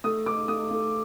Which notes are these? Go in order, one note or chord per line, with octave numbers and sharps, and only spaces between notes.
A3 D#6
A3 D6
A3 D#6
A3